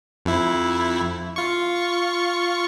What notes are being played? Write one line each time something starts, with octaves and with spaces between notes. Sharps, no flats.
F2 E4
F4 C#6